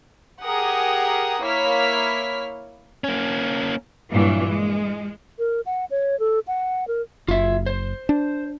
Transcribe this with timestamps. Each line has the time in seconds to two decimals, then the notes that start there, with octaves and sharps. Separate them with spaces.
0.43 G4 G#4 A#4 F#5 D#6
1.41 A#3 E4 C#5 F6 B6
3.04 A#3 C#4
4.11 G2 A#2 E3 F#3
4.48 G#3
5.39 A#4
5.66 F#5
5.91 C#5
6.20 A4
6.47 F#5
6.88 A#4
7.28 F#1 F4 E5
7.66 C5
8.09 D4